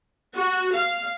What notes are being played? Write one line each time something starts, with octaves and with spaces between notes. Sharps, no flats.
F#4
F5